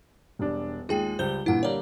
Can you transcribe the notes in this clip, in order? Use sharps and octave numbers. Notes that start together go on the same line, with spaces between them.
E1 G3 D4
D#2 G#3 F4 G#4 G5
C#2 G3 C5 G6 G7
G2 A#2 E3 E4 F#5
D3 G3 A#3 C#5 D5